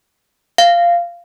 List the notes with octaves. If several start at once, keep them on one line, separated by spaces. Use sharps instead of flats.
F5